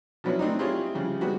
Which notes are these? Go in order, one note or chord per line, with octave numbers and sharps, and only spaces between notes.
F3 F#3 B3 C#4 D4 E4
A3 C4 D4 D#4
C4 E4 F4 G4 G#4 C#5
C#3 F3 G3
G3 G#3 B3 F#4